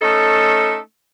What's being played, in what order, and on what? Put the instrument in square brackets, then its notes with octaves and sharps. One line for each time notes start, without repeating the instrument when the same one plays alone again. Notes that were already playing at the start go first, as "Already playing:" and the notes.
[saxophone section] A3 C#4 D#4 A4